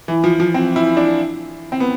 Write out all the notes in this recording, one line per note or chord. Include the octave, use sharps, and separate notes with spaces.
E3
F3
F3
C4
E4
D4
C4
B3